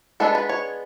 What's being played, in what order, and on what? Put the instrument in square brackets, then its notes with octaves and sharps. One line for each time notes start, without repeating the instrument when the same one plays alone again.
[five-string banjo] G#3 B3 D4 A4
B4
C#5